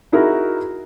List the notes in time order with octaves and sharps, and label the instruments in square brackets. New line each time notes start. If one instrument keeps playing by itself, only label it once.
[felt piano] D#4 E4 F#4 G#4 A#4